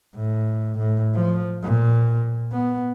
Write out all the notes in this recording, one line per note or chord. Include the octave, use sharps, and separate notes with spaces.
A2
A2
F3
A#2
B3